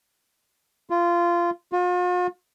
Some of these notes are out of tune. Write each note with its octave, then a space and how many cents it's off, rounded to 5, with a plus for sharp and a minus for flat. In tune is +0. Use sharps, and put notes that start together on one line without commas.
F4 -15
F4 +45